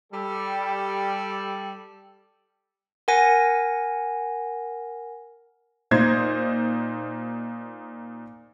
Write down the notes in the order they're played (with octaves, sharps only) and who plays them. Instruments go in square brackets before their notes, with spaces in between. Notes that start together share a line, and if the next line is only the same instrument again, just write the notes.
[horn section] G3 A4
[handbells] A#4 F#5 G#5 A#6
[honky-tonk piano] A#2 D#4 C5 G#6 C7